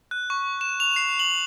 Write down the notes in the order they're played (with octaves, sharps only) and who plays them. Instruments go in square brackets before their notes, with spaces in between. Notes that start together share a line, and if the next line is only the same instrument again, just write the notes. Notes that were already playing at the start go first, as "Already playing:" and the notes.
[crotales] F#6
C#6
E7
F7
C7
F#7